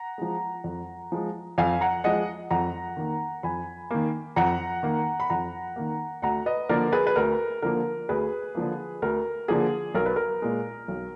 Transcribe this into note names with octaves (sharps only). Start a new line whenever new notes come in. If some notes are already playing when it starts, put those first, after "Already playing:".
Already playing: F#5 A#5
F3 G#3
F2
F3 G#3
F2 F5 G#5
F#5 A#5
F3 G#3 D#5 F#5
F2 F#5 A#5
D#3 A#3
F2 G#5 B5
D#3 A#3
F2 F#5 A#5
D#3 A#3
B5
F2 F#5 A#5
D#3 A#3
D2 F#5 A#5
B4 D#5
D3 F3 A#3 A#4 D5
G#4 B4
B4
D2 A#4
D3 F3 A#3 A#4
D2 G#4 B4
D3 F3 A#3
D2 A#4
D3 F3 A#3 G#4
B1 A#4
B4
A#4
A#2 G#3
B1